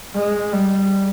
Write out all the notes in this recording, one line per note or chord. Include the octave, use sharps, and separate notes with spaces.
G#3
G3